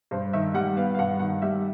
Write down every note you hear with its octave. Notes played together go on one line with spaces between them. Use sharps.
G2 C5
D#3 E5
G3 F#5
B3 F5
F5
G2 F#5
D#3 F#5
G3 E5